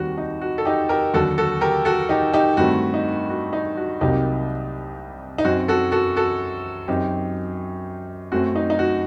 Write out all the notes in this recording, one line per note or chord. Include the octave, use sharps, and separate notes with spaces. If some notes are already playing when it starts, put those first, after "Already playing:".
Already playing: D#2 D#3 G3 C4 F#4
D#4
F#4
A4
D#4 G4
G4 A#4
D#2 D3 F#3 F#4 A4
F#4 A4
G4 A#4
F#4 A4
D#4 G4
D#4 G4
G2 D#3 A3 C4 F#4
D#4
F#4
D#4
F#4
C2 C3 F#3 A#3 D#4 G4
D#4
F#2 F#3 C4 F#4
F#4 A4
F#4 A4
F#4 A4
F#2 F#3 C4 D#4 G4
F#2 F#3 A3 C4 F#4
D#4
D#4
F#4